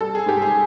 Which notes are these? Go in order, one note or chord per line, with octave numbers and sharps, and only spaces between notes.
G3 A4
G#4
G#2 G4
G#4